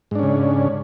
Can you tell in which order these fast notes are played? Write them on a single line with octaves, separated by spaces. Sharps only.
G#2 D4 C#4 C#3